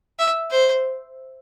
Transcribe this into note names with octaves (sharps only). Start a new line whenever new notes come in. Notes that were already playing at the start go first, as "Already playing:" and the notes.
E5
C5